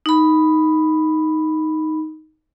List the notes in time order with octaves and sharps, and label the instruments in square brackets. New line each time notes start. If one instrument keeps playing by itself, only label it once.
[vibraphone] D#4 B5